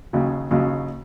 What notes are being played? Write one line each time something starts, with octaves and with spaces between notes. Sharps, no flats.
D#2 C#3 F#3
D#2 C#3 F#3